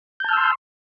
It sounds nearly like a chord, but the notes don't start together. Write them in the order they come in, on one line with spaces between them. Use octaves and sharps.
G6 A5 F6 E6 C6